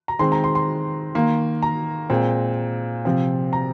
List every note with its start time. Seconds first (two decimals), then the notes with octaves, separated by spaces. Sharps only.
0.08 A#5
0.19 D#3 G#3 C4 C6
0.32 A#5
0.44 C6
0.55 C6
1.15 D#3 A#3
1.63 A#5
2.10 A#2 G#3 C4
3.05 C3 F3 C4
3.53 A#5